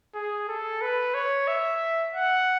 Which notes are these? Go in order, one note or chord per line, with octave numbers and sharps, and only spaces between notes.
G#4
A4
B4
C#5
E5
F#5